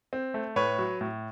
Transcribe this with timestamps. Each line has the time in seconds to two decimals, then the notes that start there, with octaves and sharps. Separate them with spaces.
0.13 C4
0.34 A3
0.56 A2 B4 C#5
0.79 F#3
1.01 A2